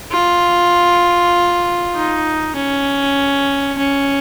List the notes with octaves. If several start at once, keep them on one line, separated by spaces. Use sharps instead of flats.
F4
D#4
C#4
C#4